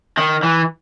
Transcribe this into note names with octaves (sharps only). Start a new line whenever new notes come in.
D#3
E3